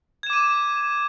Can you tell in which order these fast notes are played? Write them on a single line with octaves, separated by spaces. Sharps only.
G#6 E7 D6 D#7